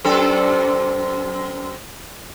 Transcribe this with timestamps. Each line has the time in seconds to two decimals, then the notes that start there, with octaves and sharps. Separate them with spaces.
0.05 F#2 C4 A4